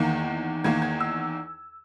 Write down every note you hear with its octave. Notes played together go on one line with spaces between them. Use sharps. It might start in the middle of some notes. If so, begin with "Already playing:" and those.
Already playing: E2 D#3 A#3
E2 D#3 A#3 G#6
G#6
E6